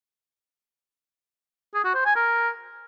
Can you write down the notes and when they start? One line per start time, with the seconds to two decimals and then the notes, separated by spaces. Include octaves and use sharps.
1.74 G#4
1.85 F#4
1.95 C5
2.06 G#5
2.16 A#4